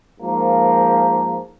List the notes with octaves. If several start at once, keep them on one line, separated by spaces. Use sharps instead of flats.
G#2 F3 A#3